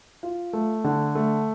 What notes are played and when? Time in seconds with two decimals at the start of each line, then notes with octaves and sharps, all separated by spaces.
0.23 F4
0.53 A3
0.84 D3
1.15 A3